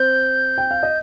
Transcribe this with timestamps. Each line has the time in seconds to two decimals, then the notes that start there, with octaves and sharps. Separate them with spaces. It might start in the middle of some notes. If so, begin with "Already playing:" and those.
Already playing: C4 C5 G6
0.58 G5
0.71 F5
0.83 D#5